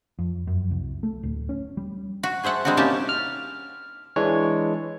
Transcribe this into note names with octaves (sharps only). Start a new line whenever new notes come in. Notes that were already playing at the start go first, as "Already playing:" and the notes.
F2
F#2
C2
A3
D1
C#4
G3
F#4
G#4 C5 E5 F#5 A5
G3 G#3 C4 D4 F#4
C3 A#3 C#4 D#4 G4 A5
F6
E3 G#3 D4 C#5